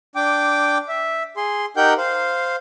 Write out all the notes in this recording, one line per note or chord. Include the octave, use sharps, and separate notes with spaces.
D4 G5 D6
E5
G#4 C6
D#4 G4 A#4 F#5 G5 G6
C5 F5